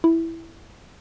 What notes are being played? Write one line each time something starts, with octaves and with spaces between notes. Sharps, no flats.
E4